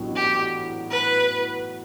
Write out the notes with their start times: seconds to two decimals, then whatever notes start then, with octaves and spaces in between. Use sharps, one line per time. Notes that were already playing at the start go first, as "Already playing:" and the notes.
Already playing: A1 A2 F#3 B3 D4
0.16 G4
0.90 B4